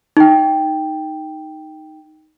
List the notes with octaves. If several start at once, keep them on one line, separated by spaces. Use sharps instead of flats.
D#4 G5